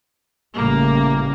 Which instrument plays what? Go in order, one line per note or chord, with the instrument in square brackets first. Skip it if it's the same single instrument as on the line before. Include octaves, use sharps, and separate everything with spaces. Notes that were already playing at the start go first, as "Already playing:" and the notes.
[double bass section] A1 C#3 G3 [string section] A#3